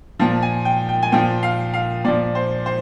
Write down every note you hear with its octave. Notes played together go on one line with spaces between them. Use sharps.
A#2 F3 A5
G#5
G5
G5
G#5
A#2 F3 G5
F5
F5
A#2 F3 D5
C5
C5